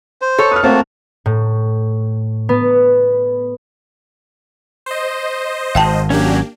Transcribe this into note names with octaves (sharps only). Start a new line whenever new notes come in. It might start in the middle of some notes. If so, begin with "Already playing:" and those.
C5
A4 C#5
B4 D#6 F6
A3 A#3 C4 F#4 A5
A2
B3
C5 D#5
G#1 F5 G5 A5
F#3 A#3 C#4 D4 G4